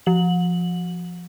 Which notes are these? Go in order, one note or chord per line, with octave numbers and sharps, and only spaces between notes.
F3 F#7